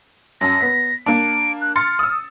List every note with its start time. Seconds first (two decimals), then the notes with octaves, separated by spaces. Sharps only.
0.41 F#2 A5 A#6
0.61 B3 B6
1.06 A#3 D4 D7
1.61 F#6
1.76 C6 F6 A6 C#7
1.99 D#6 E6